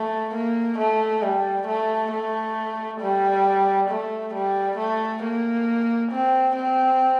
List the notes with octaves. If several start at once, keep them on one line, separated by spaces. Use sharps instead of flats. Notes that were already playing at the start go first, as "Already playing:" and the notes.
Already playing: A3
A#3
A3
G3
A3
A3
G3
A3
G3
A3
A#3
C4
C4